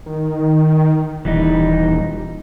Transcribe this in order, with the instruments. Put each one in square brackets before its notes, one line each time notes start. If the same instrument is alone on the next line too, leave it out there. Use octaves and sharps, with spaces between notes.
[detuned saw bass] D#3
[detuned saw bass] D#1 [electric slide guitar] E3 G3 D#4